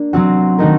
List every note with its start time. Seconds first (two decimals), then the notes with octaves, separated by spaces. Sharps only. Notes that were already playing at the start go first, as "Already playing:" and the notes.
Already playing: A#3 D4
0.13 F#3 C4 F#4
0.58 D#3 A3 D#4 F#4 A#4